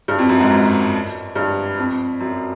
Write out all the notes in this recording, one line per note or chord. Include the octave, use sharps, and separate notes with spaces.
G2
F2
F#2
G#2
G#2
G2
F2
F#2